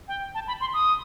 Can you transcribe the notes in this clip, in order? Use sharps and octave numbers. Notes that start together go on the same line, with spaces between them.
G5
A5
B5
C6
D#6